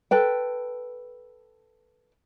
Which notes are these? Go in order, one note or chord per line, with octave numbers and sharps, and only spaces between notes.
A4 B4 G5